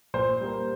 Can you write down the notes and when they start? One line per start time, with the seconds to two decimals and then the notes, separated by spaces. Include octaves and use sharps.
0.14 A#2 C5
0.40 G3 A#3